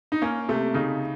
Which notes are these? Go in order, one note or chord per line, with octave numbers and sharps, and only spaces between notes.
D#4
A#3 C#4
C3 A3
C#3 D#4